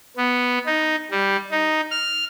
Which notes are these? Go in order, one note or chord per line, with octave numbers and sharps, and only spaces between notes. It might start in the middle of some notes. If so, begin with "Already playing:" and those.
B3
D#4
G3
D#4
F6